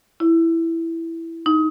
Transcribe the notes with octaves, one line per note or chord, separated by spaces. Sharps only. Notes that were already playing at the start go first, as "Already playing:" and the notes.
E4
D#4